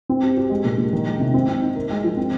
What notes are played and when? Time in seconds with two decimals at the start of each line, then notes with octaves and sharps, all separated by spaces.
0.09 C4
0.23 G4
0.37 G4
0.50 G#3
0.64 A#2
0.78 A#2
0.93 D#3
1.06 G#3
1.20 C3
1.34 C4
1.49 C4
1.61 D#4
1.76 A#4
1.90 G#3
2.04 F3
2.17 C4